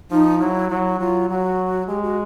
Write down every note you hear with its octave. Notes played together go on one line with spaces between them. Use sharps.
F3 D#4
F#3 E4
F#3 E4
F#3 F4
F#3 F#4
G#3 G4
F#4